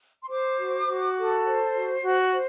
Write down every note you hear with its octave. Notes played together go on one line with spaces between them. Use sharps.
C6
C5 D6
F#4
F#4
A4
C5
F#4
F#4
C5